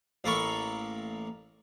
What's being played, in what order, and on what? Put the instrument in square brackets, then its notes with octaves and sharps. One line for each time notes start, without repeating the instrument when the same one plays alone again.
[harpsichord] A1 A#3 A4 A#4 B5 C#6